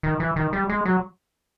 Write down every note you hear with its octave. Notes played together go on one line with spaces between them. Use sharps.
D#3
E3
D#3
G3
G#3
F#3